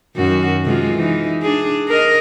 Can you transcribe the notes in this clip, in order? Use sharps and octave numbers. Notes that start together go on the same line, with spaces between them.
F#2 D#3 F#4
C3 G#3 F4
E3 D#4
D4 G#4
A#4 D#5